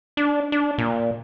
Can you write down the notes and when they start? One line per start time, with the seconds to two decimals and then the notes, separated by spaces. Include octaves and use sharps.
0.17 D4
0.52 D4
0.78 A#2